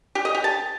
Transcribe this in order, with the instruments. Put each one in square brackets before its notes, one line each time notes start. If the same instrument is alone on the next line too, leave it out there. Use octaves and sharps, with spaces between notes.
[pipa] G4
D#5
G4
A5